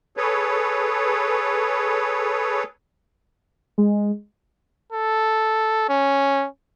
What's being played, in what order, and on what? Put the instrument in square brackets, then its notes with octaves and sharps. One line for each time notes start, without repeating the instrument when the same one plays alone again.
[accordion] G#4 A4 B4 C#5
[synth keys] G#3
[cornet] A4
C#4